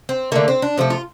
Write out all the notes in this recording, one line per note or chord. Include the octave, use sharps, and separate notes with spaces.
C4
D3 A3 A#3
C4
D4
C3 F3 A3
F4